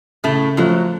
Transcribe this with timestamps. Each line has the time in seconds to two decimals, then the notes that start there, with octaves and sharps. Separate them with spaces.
0.24 A2 C#3 A3
0.57 F#2 F3 F#3 A3